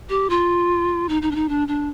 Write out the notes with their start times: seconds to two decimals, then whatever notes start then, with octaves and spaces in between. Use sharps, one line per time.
0.09 G4
0.30 F4
1.09 D#4
1.22 D#4
1.31 D4
1.35 D#4
1.49 D4
1.68 D4